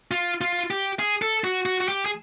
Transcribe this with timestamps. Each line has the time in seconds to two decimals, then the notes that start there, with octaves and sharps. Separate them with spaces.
0.11 F4
0.41 F4
0.70 G4
0.99 G#4
1.22 A4
1.44 F#4
1.66 F#4
1.80 F#4
1.88 G4
2.06 G#4